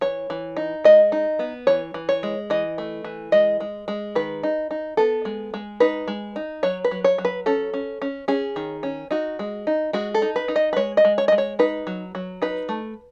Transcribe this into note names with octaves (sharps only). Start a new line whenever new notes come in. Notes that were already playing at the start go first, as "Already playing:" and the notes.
E3 C#5
E3
D#4
G#3 D#5
D#4
B3
E3 C#5
E3
C#5
G#3
E3 D#5
A3
E3
G#3 D#5
G#3
G#3
D#3 B4
D#4
D#4
B3 A4
G#3
G#3
D#4 B4
G#3
D#4
F#3 C#5
B4
F#3
C#5
F#3
B4
C#4 A4
C#4
C#4
C#4 G#4
D#3
C#4
D#4 F#4
G#3
D#4
G#3 F#4
A4
D#4
B4
D#4
D#5
B4
G#3 C#5
D#5
G#3
C#5
G#3 D#5
C#5
D#4 B4
F#3
F#3
D#4 B4
A3